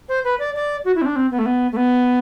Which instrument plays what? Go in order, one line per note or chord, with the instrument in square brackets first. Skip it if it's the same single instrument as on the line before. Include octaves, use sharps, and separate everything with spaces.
[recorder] C5
B4
D5
D5
F#4
E4
C4
D4
C4
B3
A3
B3
A3
B3